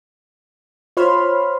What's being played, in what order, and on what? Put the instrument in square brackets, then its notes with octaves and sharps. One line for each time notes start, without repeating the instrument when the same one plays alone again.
[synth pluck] F4 C5 C#5 B5 C6 F6